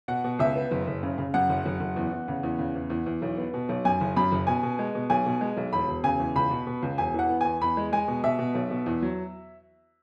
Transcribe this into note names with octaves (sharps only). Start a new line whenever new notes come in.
B2 F#5
B2
C#2 E5
B3
F#1
F#1
C#3
C#3
F#2 F#5
F#1
F#1
F#1
E2
E2
C#3
E2
C#3
E2
E2
E2
B1
B3
B2
B1
F#2 G#5
F#1
F#2 B5
F#1
B2 G#5
B2
G#3
B2
B1 G#5
B2
G#3
B1
E1 B5
E1
C#3 G#5
E2
C#2 B5
B2
B2
C#2
E1 G#5
E3 F#5
B3
E2 G#5
E2 B5
G#3
G#3 G#5
B2
B2 E5
B2
B1
B2
E2
F#3